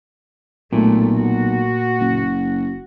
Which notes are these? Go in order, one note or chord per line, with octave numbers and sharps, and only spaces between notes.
B1 A#2 A3
F#4
F#1